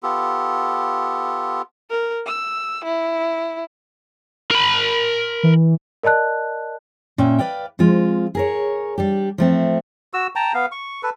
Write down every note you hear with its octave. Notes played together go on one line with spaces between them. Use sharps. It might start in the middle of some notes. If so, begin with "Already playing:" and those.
B3 F4 G4 A4
A#4
E6
E4
A#4 B5
E3
A#4 D5 D#5 A5 F#6
A#2 C#4 E5 G5
B4 D5 F5 G5
F3 G#3 C4 F4
G#4 A#4 C#5
G3 D4 G4
F3 A3 C4
F#4 E6
G5 A5 A#5
B3 F5
C#6
A4 B4